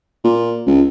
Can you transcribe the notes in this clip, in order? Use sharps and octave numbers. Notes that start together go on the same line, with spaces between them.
A#2
C#2